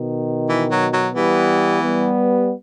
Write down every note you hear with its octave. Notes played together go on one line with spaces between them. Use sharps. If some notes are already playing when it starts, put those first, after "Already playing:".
Already playing: B2 D#3
E3
F#3
F#3
E3 G3 B3
G3 B3